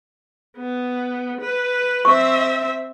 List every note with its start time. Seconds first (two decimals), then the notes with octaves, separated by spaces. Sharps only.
0.57 B3
1.41 B4
2.05 C4 E5 C#6